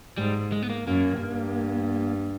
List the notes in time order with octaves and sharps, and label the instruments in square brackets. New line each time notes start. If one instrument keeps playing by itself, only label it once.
[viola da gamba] G#2 [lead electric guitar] G3
[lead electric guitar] G#3
B3
A#3
[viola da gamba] F#2 [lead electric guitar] A#3
[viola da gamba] G2